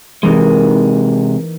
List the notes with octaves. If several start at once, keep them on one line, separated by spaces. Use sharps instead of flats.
C3 E3 G#3 A#3 D#4